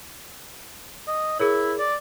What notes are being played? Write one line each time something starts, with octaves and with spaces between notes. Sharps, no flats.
D#5
E4 G#4 A#4 C#5
D5